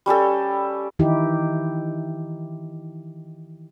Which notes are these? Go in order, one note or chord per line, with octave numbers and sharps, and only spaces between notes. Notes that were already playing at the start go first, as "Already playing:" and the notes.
G3 C#4 G4 A4
D#3 E3 D#4 E4 G4